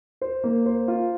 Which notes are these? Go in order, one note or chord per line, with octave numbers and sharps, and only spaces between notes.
C5
A#3
C5
F4